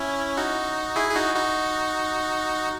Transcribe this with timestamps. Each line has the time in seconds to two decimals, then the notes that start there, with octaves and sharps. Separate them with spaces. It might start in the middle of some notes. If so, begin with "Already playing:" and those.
Already playing: C#4 E4
0.37 D#4 F#4
0.96 E4 G#4
1.10 G#4
1.15 D#4 F#4
1.35 D#4 F#4